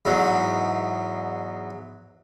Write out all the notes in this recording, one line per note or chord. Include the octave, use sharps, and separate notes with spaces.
E2 G#2 F#3